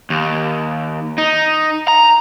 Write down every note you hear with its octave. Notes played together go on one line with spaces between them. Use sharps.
D#2
D#4
A#5